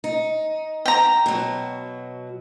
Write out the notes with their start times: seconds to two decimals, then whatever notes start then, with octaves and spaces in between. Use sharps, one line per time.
0.04 D#4
0.86 G5 A#5
1.26 B2 F#3